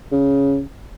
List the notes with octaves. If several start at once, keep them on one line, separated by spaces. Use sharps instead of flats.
C#3